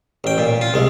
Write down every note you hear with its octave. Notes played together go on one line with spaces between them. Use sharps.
A1 G5
A#2
F4
C2 G#3